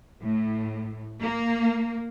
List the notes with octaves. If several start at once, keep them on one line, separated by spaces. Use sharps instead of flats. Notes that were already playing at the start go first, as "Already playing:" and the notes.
A2
A#3